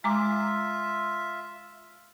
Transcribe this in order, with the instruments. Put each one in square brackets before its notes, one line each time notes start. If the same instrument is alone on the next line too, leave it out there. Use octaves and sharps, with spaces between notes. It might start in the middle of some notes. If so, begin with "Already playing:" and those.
[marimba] G#3 A#5 D6 [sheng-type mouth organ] F4 E5